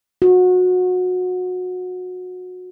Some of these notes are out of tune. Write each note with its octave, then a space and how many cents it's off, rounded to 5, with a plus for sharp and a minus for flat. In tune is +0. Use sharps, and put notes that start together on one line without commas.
F#4 -25